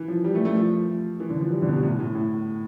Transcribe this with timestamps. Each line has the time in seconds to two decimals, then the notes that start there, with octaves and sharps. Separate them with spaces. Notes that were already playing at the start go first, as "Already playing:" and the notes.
Already playing: E3
0.08 F3
0.24 G3
0.35 A3
0.45 A3
0.56 F3
1.20 E3
1.30 D3
1.40 F3
1.51 G3
1.62 D3
1.68 B2
1.73 C3
1.83 A2
1.99 A2
2.15 A2